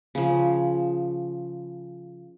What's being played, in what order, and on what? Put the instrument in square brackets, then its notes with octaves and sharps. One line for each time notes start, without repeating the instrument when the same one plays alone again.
[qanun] C#3 F3